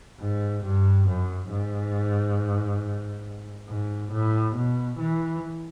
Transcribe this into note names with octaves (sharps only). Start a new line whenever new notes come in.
G#2
G2
F#2
G#2
G#2
A2
B2
E3